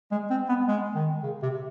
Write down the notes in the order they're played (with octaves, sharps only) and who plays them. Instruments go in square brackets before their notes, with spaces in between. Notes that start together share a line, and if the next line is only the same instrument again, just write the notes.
[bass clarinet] G#3
C4
B3
G#3
D#3
C#3
C3